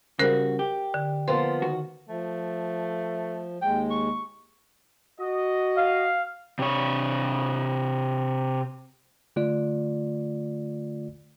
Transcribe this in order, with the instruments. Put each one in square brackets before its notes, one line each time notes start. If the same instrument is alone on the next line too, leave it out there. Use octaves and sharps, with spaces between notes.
[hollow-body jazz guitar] C#3 G3 F#4 [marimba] A#4 C5 F#6
[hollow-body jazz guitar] G4
[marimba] D3
[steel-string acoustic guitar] F3 A#3 B3 [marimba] C6
[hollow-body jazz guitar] D#2 F#4
[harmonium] F3 [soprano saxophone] A3
[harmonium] D#2 G#3 [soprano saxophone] G5
[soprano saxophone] C#6
[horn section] F#4 D#5
[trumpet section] F5
[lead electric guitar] C3 C#5
[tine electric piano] D3 A3 F4 D5